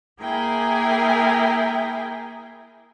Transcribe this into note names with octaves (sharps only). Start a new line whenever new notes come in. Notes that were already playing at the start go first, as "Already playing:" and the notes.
A#3 E4 G#4 A#4 G5 G#5